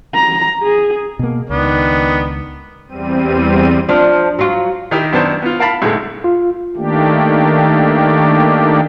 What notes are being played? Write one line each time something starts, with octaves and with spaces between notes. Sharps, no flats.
A#5
G#4
B2 A#3
C#2 D#3 B3 D4
E2 G3 C4 D#7
F3 D4
F#3 F4
D#3 D#4 E4 G4
F#2 D#3 B3 D4 C5 A5
B3 F4
A#4 F5 A5 B5
B1 A2 D3 G#3
F4
D#3 A3 A#3 D4 G4